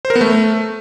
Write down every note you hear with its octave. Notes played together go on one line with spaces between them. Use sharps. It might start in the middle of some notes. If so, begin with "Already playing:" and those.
C5
A#4
B3
A3